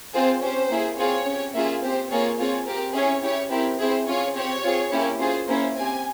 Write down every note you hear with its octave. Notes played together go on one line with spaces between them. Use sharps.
C4 F4 G#4 C5
C#4 G4 C5
A#3 E4 G#4
C4 F4 G#4 C#5
C#4 G4
A#3 C#4 F4 G#4 E5
C4 G4 C5
A#3 F4 G#4 C#5
C4 F4 G#4 C#5
C4 G4 A#4
C#4 E4 G#4 C#5
C#4 E4 G4 C#5
C4 E4 G4 A#4
C4 E4 G#4 C5
C#4 F4 G#4 C#5
C4 G4 C#5
C4 F4 G#4
A#3 C#4 E4 G4
C#4 F4 G#4 C5
A#3 C#4 E4 C5
C4 G4 G#5